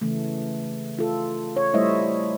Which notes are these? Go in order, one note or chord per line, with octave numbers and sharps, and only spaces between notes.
C#3 E3 A3
F4 A4
C#5
G3 A3 E4 C5 D#5 E5